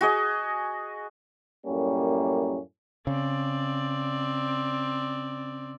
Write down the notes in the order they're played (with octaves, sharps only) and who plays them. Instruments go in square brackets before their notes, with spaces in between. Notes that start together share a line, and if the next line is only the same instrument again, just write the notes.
[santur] F#4 G#4 D#5
[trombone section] F#2 A2 G3 A#3 C#4
[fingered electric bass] C#3 [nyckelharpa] C4 D5